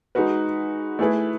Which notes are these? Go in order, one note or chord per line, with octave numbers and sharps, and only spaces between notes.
G#3 D#4 F#4 B4
A3 E4 G#4 B4